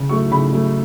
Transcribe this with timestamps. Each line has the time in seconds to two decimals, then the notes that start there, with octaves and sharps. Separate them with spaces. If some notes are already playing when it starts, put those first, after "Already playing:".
Already playing: C#3
0.09 F#3 A3 C#6
0.31 C#3 B5
0.52 F#3 A3